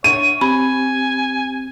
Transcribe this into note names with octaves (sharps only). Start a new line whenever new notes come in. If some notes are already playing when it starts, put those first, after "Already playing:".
D4 C#5 E5 F#5 D#7
C4 G4 G#5 B5